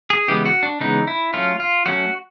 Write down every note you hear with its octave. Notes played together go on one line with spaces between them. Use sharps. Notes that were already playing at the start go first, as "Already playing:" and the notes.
G#4
C#3 E3 G#3 B3 G4
F#4
D4
C#3 E3 G#3 B3 D#4
E4
F#3 A3 C#4 F4
F4
F#3 A3 C#4 F#4